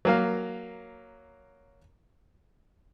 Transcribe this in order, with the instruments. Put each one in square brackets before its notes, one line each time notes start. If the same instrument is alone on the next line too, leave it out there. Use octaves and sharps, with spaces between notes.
[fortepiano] F#3 A#3 F5